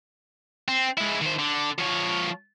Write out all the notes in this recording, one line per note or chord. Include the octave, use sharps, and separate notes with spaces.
C4
G#3 E4
D#3 C5
D3
F3 C#5